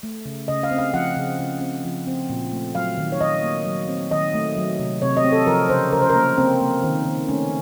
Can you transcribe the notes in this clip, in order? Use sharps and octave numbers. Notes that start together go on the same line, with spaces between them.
A3
C#3
C#3 D#5
F5
C4
F5
F3 F#5
C#3
C#3
C4
F3
C4
A#2
A3
F#3 F5
D#3
C#5
D#3 D#5
A#3
F#3
C4
D#3 D#5
A3
F#3
C3
C3 C#5
D#5
C4
A4
F3 A#4
C#3 C5
C#3 A#4
C5
A#4
A#3
A#3 C4
A#3
D#3
D#3
A3 C#4